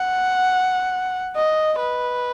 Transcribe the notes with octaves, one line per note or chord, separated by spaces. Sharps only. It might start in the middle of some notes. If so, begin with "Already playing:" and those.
Already playing: F#5
D#5
B4